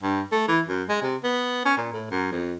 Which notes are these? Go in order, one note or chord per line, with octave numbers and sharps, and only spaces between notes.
G2
A3
E3
F#2
G#3
C3
B3
C#4
A#2
A2
F#2
F2